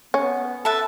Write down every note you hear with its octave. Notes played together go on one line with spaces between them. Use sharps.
B3 C#4
A4 B4 E5 A5